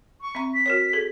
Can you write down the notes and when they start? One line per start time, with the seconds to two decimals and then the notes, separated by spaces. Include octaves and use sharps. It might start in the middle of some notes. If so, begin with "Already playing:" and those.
0.21 C#6
0.35 C4 E5 A#5
0.54 B6
0.66 F#4 A#4 C#5
0.93 G#4 A4